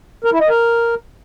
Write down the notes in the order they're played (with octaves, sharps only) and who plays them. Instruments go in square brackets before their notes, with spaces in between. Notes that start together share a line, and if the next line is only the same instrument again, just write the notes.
[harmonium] A#4
E4
D#5
A#4